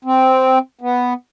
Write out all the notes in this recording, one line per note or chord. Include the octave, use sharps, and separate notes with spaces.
C4
B3